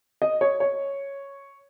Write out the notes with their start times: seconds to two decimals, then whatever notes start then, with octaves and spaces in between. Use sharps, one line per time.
0.22 D#5
0.41 C#5
0.60 C#5